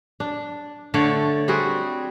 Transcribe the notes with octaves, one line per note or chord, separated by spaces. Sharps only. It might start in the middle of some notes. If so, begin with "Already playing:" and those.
D4
D3 A3 C#5 D5
G3 C4 F#4 G#4